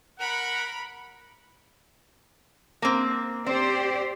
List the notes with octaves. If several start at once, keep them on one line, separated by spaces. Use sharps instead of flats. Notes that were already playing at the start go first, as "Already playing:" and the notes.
A#4 F#5 B5
A#3 C4
C4 G4 C5 D5